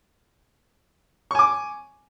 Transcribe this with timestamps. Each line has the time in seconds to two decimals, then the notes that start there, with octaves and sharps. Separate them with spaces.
1.31 C#6
1.35 G#5
1.39 D6